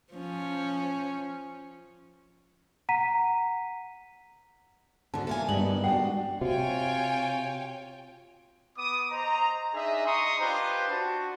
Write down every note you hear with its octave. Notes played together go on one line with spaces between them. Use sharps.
F3 C#4
F#5 A#5 B6 D#7
G#2 D3 D4 F#4 A5
E3 A#3 E4 A4 A#4 G#5
G2 G3 G#3 B3 D#4 F#7
D4 F#4 F#5 G5
C3 F4 F#4 C#5 G5 G#5
B3 D6 D#6
C5 D#5 A#5
D4 D#4 G#4 D#5 E5
D#5 A#5 C6 C#6 D#6
D4 F4 G4 B4 C5
F#4 A5